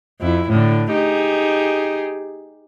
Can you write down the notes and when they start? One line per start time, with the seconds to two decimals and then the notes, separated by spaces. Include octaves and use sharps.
0.21 F2 E4
0.49 A2 D3
0.92 D#4 G4 G#4